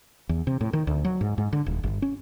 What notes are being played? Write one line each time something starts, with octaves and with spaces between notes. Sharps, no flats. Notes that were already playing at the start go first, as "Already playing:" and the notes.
E2
C3
A2
D#3
D2
F#3
G#2
G#2
D3
D#1
G1
C#4